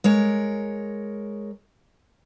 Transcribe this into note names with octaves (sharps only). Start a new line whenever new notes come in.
G#3 A#4 C#5